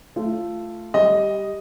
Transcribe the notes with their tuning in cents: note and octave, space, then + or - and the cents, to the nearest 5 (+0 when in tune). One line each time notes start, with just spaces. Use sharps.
A3 +0 F4 -15
G3 +10 D#5 +0